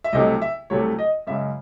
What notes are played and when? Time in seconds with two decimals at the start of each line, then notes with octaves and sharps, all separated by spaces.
0.04 E5
0.13 C2 C3 F#3 A3 D#5
0.42 E5
0.70 C2 C3 F#3 A3 C#5
0.99 D#5
1.27 F#2 C#3 G#3 E5